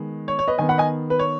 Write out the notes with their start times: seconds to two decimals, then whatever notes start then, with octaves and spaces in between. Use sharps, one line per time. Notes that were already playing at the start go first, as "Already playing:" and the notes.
Already playing: D#3 G#3 B3
0.28 C#5
0.39 C#5
0.48 B4 D#5
0.58 D#3 B3 D#5 G#5
0.69 F#5 B5
0.78 D#5 G#5
1.10 B4
1.19 C#5